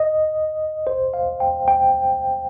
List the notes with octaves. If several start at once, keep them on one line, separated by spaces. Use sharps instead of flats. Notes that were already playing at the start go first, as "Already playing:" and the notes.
Already playing: D#5
C5
F5
G5
G5